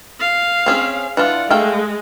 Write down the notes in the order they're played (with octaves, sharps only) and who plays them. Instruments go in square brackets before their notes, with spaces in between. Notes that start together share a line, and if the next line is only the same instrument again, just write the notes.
[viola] F5
[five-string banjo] C4 C#4 G#4
[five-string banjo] E3 D4 F4 [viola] F#5
[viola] G#3 [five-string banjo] A3 F5 G5